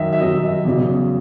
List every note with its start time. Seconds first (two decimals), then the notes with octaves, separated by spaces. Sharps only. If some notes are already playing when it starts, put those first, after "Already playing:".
Already playing: F#2 D#3 F#3 D#5 E5
0.13 E5
0.20 F#2 D#3 F#3 D#5
0.44 D#5
0.65 E2 C#3 F#3